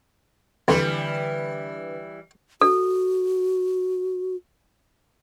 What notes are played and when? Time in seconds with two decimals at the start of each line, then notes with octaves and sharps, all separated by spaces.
0.68 F2 D3 E3 G3 B4
2.61 F#4 A4